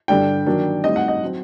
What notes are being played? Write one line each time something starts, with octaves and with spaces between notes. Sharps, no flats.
G2 D3 G3 D4 G5
D#3 F#3 A#3 D4
A2 G3 C4 D#4 D#5
F#5
D#5
F#3 C4